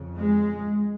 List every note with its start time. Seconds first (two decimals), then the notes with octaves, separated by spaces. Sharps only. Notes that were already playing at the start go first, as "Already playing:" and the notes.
Already playing: F2 C#3
0.19 G#3